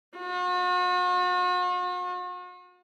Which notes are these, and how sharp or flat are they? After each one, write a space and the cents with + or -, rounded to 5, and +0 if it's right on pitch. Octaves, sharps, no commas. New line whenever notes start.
F#4 -45